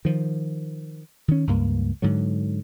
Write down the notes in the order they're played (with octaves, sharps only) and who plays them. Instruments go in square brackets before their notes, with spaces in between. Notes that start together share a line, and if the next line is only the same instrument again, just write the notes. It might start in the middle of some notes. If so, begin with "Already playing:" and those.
[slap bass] D#3 F3
D#3 C#4
C#2 G2 A#3
G#2 D3 F#3